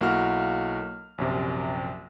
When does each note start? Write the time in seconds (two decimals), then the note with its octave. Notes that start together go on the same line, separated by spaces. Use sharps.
0.01 B1 A#3 E4 F#4 F6
1.18 A#1 F#2 C3